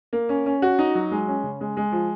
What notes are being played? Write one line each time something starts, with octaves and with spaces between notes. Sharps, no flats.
A#3
C#4
C#4
F#4
D#4
F#3
G#3
C#4
C#3
G#3
G#3
F3